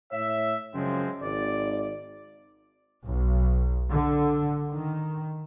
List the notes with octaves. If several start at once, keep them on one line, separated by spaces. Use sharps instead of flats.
A2 C#5 E5
F#2 C#3 F3 G#3 C4
G#1 D5
B1
D3
D#3